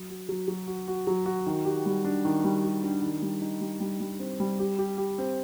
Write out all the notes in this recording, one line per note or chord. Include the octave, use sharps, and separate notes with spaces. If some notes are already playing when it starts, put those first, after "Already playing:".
Already playing: F#3
F#4
F#3
F#3
F#4
F#4
F#3
F#4
D#3
G4
G3
D4
D#3
G3
G4
D4
D#3
G3
D#4
G3
G3
G3
C4
G3
G4
G4
G4
C4